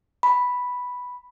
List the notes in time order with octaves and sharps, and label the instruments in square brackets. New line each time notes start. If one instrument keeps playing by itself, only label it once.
[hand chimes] B5